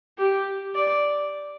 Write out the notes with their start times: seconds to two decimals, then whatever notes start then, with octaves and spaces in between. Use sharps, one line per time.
0.18 G4
0.75 D5